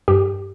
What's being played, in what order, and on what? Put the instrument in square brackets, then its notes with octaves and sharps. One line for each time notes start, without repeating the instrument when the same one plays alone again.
[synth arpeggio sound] G2 G4